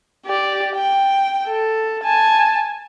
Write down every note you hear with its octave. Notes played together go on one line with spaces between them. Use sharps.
G4 D5
G5
A4
G#5 A5